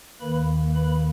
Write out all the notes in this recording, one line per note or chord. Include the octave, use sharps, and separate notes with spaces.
D#2 D#3 A#3 B4 B5
B4 B5